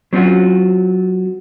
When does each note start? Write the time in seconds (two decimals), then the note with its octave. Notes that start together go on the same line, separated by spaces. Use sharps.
0.13 F#3 C4 C#4 F4 F#4